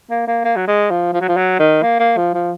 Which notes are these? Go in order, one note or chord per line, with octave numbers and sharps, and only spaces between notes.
A#3
A#3
A#3
F#3
G#3
F3
F3
F#3
F3
F#3
D#3
A#3
A#3
F3
F3